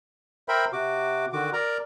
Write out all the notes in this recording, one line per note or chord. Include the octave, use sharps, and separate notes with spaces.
A#4 C5 E5 G5 B5
C3 F#4 D6
D3 D#3 F#4 D6
A#4 D5 A#5